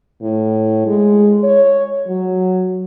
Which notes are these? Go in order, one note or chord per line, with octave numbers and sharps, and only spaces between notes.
A2
G#3
C#5
F#3